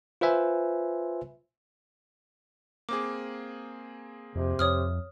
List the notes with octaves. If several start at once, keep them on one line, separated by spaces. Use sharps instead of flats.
F4 B4 C5 E5 G#5
A#3 C4 G#4 D6
F2 C3
F2 C#5 D#6 F6